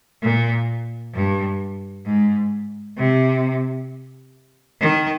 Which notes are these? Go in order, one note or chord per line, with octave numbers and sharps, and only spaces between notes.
A#2
G2
G#2
C3
D#3